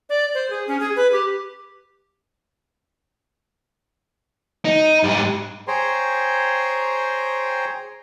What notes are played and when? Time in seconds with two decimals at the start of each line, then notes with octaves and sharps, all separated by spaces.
0.09 D5
0.34 C5
0.50 G#4
0.67 C#4
0.80 G#4
0.96 B4
1.12 G4
4.65 D#4
5.03 G#2 G3
5.68 G#4 C5 C#5 G5 A#5 C6